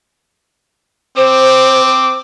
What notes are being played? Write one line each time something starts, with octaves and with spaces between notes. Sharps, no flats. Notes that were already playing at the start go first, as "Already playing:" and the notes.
C4 C5 D6